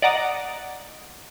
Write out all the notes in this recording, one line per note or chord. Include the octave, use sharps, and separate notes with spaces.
D5 D#5 F#5 A#5 D6 D#6